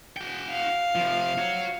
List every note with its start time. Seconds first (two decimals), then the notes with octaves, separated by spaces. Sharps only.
0.17 F#4 G5
0.51 F5
0.95 C3 F3
1.38 F#4 C#5